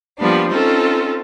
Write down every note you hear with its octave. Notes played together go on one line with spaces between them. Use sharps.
F3 G3 A#3 B3 D4
C4 C#4 D#4 F4 A4